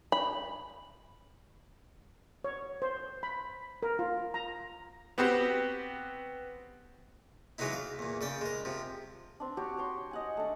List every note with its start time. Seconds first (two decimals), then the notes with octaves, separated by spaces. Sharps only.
0.12 B5
2.44 C#5
2.82 C5
3.23 B5
3.83 A#4
3.99 F4
4.34 A#5
5.18 B3 C4 F#4 G4
7.58 E3 F#3 G#3 B3 D#4 E4
7.73 F5
7.99 E2 A#2
8.21 C#3 D5 G5
8.41 G#3 A#4
8.65 C3 F3
9.40 C4 D4
9.57 F#4 G4 C#5
9.77 G4 C#5 C6
10.11 D#5 F#5 G#5
10.37 A3 D4